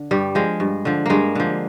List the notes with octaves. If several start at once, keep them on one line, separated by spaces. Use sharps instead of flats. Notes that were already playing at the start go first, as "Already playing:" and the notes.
Already playing: D3
G2 G3
F3 G#3
G2
D3 F3
G2 G#3 A#3
D3 F3